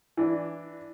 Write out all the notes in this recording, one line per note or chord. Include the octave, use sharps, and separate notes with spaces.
E3 D4